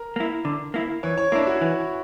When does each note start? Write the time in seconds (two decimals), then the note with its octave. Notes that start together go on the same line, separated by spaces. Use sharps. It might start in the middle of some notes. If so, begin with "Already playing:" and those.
Already playing: A#4
0.16 A#3 E4
0.45 D3
0.74 A#3 E4
1.03 E3 C#5
1.18 C#5
1.32 A#3 D4 E4
1.47 F#4
1.61 E3